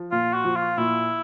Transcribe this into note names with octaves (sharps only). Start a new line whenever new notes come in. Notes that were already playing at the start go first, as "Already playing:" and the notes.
Already playing: F3
A#2 F4
F#4
F3
F4
A#2 E4